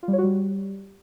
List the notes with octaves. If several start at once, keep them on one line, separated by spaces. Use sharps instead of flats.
F4
G3
C#5
F#4
G3